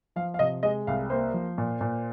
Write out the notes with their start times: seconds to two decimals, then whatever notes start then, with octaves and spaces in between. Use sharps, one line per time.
0.16 F3 F5
0.34 F5
0.39 C3 D#5
0.63 G#3 D#5
0.87 C2 F5
1.10 A#3 C5
1.34 F3
1.58 A#2
1.81 A#2